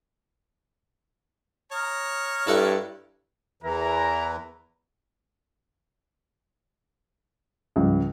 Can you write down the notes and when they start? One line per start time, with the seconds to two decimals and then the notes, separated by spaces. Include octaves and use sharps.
1.72 C#5 A#5 D#6 F6
2.47 G2 E4 A4 F#5
3.63 E2 E3 E4 A#4 A#5
7.76 C#2 G#2 F3 G3